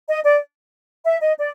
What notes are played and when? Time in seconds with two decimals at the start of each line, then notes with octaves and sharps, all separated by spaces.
0.08 D#5
0.24 D5
1.05 E5
1.21 D#5
1.38 D5